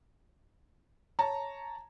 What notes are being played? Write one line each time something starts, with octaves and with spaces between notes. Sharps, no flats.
C#5 A5 A#5